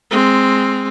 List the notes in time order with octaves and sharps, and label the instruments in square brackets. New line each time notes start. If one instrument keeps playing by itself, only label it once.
[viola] G#3 C4